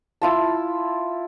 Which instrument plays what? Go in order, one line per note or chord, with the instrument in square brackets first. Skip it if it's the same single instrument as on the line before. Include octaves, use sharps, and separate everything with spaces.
[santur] E4 F4 A5